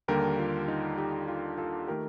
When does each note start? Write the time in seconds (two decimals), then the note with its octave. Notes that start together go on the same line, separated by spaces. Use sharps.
0.08 D#2 D3 G3 A#3 G4 A#4
0.39 F4
0.68 D#4
0.98 D#4 G4
1.28 F4
1.58 F4 A4
1.88 D#3 A3 G4 A#4